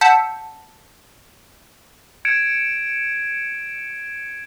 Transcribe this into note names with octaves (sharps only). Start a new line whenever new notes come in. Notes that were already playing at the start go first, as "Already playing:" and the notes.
F#5 A5 E6 G6 B6 C#7
G#6 C#7 D7 E7